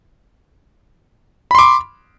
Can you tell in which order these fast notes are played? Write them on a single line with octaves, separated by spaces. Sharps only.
B5 C6 D6